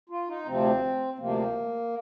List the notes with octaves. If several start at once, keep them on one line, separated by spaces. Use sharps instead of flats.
F4
D#4
D2 C3 F3 C4
C4
D2 C3 F3 A#3